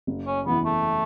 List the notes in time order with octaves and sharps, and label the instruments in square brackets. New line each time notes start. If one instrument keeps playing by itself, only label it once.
[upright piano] F#1
[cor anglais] C#4
[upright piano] E2 E3 [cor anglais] B3
[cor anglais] A3